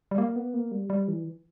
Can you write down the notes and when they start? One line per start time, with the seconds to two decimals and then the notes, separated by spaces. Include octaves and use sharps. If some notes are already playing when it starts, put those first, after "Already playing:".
0.11 G3
0.18 A#3
0.36 B3
0.54 A#3
0.71 G3
0.90 G3
1.08 E3